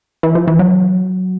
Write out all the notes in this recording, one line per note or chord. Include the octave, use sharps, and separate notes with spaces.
E3
F3
E3
F#3